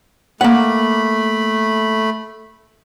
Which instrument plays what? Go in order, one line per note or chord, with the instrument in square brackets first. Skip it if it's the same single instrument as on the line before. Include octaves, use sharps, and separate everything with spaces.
[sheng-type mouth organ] A3 B5 [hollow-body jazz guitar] A#3 F#5